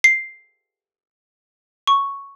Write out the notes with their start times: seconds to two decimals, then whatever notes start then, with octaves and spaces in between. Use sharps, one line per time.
0.04 C7
1.87 C#6